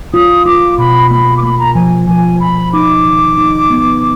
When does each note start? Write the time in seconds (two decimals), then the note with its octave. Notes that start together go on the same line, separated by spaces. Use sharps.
0.14 F4 D#6
0.46 F4 D6
0.78 B2 B5
1.11 A#3 B5
1.37 D6
1.43 A#3 B5
1.59 A#5
1.75 F3 G#5
2.07 F3 G#5
2.40 F3 B5
2.73 D#4 D6
3.05 D#3
3.38 D#4
3.70 B3